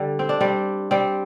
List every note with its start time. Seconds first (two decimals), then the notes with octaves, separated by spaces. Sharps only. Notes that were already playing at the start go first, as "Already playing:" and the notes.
Already playing: D3 G3
0.19 C4
0.29 D4
0.41 G3 C4
0.91 G3 C4